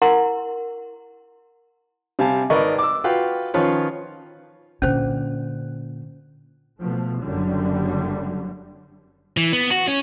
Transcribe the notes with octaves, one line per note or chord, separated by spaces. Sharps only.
E4 A#4 F#5 C6
C3 G3 F5 G#5 A5
G#1 A#4 B4 D5 D#5 C#6
D6 E6
F4 F#4 B4 F5 G5
D#3 F3 C#4 F4 B4 C#5
A#2 D3 C#4 C5
B2 F3 A3
F#1 F#2 D3 F#3 G3
E3
B3
F#4
C#4